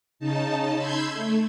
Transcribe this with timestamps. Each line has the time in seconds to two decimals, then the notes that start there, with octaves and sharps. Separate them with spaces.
0.19 C#3 D#4 A5
0.76 B5 C6 E6 G6 G#6
1.12 A3